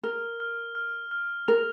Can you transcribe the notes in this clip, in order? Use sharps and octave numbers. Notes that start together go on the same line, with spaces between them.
A#4 F6
F6
F6
F6
A#4 F7